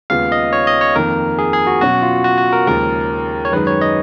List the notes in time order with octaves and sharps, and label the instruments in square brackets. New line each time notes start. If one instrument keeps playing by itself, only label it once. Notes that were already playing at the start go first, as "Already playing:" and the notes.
[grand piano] D#2 C#3 G#3 B3 F4 [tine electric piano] F5
[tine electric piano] D#5
C#5
D#5
C#5
[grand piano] F2 D#3 A#3 [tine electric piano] A#4
[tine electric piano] G#4
G#4
F#4
[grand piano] B2 F#3 C#4 [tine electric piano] F#4
[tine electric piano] F4
F#4
F#4
A#4
[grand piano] D#2 C#3 F3 G#3 [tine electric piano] A#4
[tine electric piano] C#5
[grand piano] F#2 D#3 G#3 D#4 [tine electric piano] B4
[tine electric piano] C#5
D#5